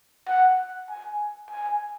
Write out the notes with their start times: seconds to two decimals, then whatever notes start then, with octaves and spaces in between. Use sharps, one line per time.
0.28 F#5
0.90 G#5
1.50 G#5